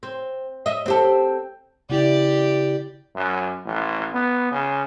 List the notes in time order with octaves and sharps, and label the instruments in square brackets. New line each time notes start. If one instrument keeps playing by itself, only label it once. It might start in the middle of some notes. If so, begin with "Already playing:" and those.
[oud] C4
D#5 E5
C4 G4 A4
[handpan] C#3 E4 [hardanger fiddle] G4 D5
[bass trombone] F#2
A1
B3
C#3